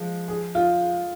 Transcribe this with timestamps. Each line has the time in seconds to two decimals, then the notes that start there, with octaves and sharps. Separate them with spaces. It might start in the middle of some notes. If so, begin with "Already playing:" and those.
Already playing: F3 G#3
0.28 G#4
0.55 F4